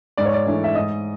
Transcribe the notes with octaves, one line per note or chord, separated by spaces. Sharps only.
G#2 D5
C#5
D5
E3 A3 D4
E5
G#2 D#5